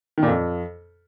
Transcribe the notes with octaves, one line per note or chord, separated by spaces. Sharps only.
D#3
A#2
F2